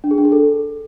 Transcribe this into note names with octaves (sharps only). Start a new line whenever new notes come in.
D4
G#4
D4
G#4
A4